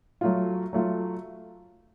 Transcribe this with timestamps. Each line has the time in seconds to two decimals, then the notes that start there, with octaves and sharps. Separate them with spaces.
0.21 F#3 A3 F4
0.73 F#3 A3 F4